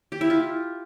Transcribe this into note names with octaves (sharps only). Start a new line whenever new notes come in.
G4
E4
F4